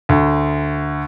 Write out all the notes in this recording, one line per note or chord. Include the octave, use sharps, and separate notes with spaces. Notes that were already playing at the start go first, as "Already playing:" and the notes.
D2